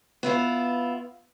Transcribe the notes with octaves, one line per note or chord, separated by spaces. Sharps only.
B3 E4 F4